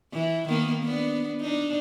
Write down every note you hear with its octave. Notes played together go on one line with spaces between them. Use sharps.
E3
D#3 A#3 B3
B3 D4
D4 D#4